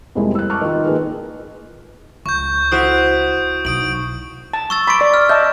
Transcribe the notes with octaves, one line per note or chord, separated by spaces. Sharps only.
F2 C3 G3 G#3 A#3 E4
E6 F#6
A5 C#6 D6 F6 F#6
D#3 F4
D#3 A#3 D#4 F4 G#4 B4
C#2 C#6 G6
E4 F#4 C5 D#6 D7
B1 D#6 D7 F#7
A5
C#6 E6 A6
B5 C6 D6 D7
D5
F6
D#5 E5 A5 G6